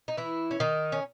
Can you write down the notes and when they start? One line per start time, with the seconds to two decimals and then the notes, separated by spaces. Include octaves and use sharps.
0.08 D#4
0.17 E3 E4
0.51 C#4
0.60 D#3 D#4
0.92 C#4